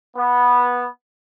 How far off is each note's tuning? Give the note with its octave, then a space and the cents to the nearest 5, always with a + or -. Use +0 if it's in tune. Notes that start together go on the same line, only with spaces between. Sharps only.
B3 -10